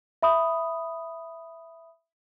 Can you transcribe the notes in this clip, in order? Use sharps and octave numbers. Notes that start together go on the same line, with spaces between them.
E5 B5 D#6